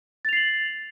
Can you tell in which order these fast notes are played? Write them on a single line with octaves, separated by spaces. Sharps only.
A6 F7 C7 F#7